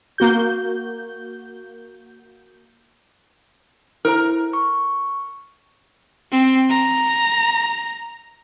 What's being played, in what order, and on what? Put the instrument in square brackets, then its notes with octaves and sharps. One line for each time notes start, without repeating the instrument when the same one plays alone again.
[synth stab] A#3 F#4 G6
[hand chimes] E4 C5 [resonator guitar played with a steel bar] A#4 A#5
[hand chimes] C#6
[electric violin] C4
A#5